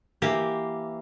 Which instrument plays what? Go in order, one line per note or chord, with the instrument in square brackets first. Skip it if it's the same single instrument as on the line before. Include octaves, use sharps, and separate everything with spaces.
[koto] E3 A#3 G4